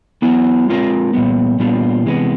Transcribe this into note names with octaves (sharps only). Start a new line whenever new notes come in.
F#3 B3 E4
G#3 C4 F4 A#4
A#2 G3 B3
A#2 G3 B3 D4 F4
C3 E3 G#3 B3